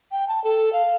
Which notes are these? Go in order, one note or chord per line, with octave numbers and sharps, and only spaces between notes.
G5
A5
A4
F5